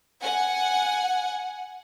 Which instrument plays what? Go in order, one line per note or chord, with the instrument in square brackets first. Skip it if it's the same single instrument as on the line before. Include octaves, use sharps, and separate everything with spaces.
[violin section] F#5 G#5